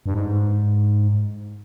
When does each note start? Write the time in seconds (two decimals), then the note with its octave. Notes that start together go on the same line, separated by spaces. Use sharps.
0.06 G2
0.14 G#2